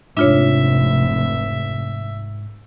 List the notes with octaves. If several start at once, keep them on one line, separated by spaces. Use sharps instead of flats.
F1 G#2 D4 F4 C#5 E5